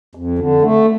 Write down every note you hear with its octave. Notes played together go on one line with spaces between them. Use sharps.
F2
D3
A3